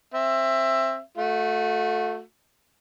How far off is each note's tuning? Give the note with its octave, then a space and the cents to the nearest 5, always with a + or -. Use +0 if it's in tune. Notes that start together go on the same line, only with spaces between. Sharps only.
C4 +20 E5 +15
A3 +0 F#4 -35